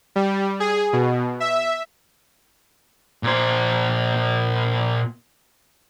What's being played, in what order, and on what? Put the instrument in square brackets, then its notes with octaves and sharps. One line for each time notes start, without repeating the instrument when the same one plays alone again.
[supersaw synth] G3
G#4
B2
E5
[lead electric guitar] A#2 C5